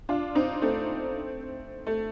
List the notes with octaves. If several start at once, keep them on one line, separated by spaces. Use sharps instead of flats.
D4 F4
C4 D#4
A3 C4
A3